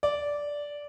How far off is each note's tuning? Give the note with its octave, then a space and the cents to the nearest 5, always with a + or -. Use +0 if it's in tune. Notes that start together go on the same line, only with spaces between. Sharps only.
D5 -10